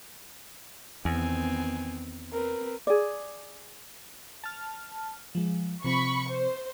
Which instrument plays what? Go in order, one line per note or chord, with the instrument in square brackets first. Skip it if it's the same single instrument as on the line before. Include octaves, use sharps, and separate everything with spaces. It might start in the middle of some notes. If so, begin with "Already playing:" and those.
[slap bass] E2 [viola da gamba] D#3 B3 C4 [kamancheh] G#5
[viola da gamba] C4 [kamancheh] A#4 B4
[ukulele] G#4 D5
[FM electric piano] A5 F6
F3 G#3
[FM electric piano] C3 F3 C4 [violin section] B5 C#6
[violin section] C5